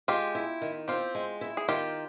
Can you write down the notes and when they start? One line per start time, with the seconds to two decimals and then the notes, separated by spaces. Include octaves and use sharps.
0.08 G#3 F4 G4
0.35 E4
0.62 D#3
0.88 C4 F4 G4
1.15 G#3
1.41 E4
1.57 G#4
1.68 D#3 F4 G4